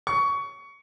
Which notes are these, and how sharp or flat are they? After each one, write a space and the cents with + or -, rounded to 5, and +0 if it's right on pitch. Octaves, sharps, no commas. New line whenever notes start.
C#6 +20